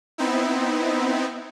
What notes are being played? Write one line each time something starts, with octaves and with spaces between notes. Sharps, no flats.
B3 C4 D#4 E4